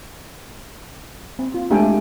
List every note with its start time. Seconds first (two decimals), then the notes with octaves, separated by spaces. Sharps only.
1.39 C4
1.54 F4
1.70 G#3 A3 D4 G4 G5 G#5